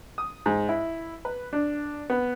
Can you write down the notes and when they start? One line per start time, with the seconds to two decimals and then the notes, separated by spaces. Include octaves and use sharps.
0.18 D#6
0.46 G#2
0.69 E4
1.25 B4
1.53 D4
2.10 B3